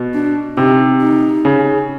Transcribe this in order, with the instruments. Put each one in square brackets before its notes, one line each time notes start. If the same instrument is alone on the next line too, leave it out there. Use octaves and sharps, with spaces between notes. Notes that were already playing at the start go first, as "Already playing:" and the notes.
Already playing: [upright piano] B2
[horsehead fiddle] D4
[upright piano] C3 [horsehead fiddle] D#4
[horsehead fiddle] D#4
[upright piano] C#3